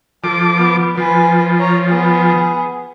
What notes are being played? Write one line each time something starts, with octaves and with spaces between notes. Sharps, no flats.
F3 A4 D6
B3
F3 B4 G#5
C#5 A#5
B3 G#4